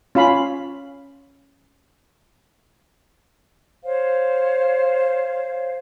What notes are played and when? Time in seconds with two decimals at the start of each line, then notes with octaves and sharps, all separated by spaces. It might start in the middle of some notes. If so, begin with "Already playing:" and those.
0.15 C#4 F4 F5 B5
3.84 C5 C#5 F5